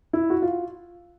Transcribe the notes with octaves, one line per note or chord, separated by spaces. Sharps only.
E4
F#4
F4